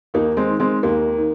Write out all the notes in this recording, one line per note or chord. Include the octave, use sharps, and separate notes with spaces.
D#2 A#3 D#4
G#3 C4
D#3
G#3 C4
D#2 A#3
D#3